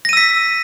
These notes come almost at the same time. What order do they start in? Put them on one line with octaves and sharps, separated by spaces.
A#6 D#7 E6 B6